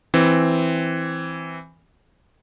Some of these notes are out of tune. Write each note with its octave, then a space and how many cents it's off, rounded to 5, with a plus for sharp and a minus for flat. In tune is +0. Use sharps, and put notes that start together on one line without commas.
E3 +0 C4 +0